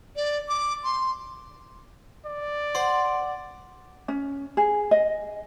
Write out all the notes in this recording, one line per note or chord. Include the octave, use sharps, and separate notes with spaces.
D5
D6
C6
D5
C5 F#5
C#4
G#4
D#5